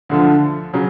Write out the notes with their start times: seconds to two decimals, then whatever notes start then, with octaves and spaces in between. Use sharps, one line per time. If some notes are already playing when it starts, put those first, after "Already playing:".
0.09 D2 D3 F3
0.74 C#3 F#3